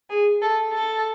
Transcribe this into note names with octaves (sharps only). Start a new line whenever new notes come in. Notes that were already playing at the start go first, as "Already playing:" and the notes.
G#4
A4
A4